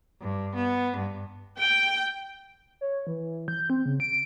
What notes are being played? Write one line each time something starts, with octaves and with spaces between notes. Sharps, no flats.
G2
B3
G2
G5
C#5
E3
G6
C4
C#3
D7